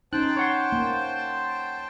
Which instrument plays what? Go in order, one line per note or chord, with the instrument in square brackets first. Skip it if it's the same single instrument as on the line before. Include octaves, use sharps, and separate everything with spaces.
[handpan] C#4 D#4 [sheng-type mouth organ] C5 G5 A5 [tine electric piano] F#6
[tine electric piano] C#5 F#5 C6
[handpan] A#3